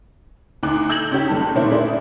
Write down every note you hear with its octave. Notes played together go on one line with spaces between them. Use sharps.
D2 D#4 D6 F#6
E6 G6 G#6 A#6 E7 F#7
C#3 C#4 D#4 G4
F#1 G3 A4
A#2 D3 A3 C4 D#4 E4
D4 E4 G#4 A#4 D5